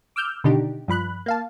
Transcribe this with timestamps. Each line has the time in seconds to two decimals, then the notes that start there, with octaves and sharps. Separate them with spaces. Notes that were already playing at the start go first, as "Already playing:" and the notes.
0.16 D6 E6 F6 G6
0.44 B2 D3 D#3 D4 D#4 G4
0.88 G2 F3 B5 F#6
1.26 A#3 F5 A5